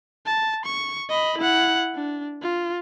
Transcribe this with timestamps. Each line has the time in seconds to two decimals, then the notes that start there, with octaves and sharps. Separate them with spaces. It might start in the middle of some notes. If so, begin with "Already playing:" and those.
0.26 A5
0.65 C#6
1.10 D#5 B5
1.38 E4 F#5
1.95 D4
2.42 F4